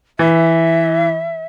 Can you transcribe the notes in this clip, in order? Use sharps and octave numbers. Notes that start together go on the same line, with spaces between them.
E3 E5